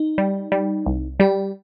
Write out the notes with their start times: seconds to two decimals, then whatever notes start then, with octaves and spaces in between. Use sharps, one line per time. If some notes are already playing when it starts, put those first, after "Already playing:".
Already playing: D#4
0.18 G3
0.52 G3
0.86 C2
1.20 G3 G4